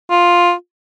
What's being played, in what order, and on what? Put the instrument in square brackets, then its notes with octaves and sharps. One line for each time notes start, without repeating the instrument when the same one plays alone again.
[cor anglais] F4